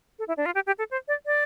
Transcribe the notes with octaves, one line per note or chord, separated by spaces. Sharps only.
A4
E4
D4
F4
G4
G4
A4
C5
D5
D5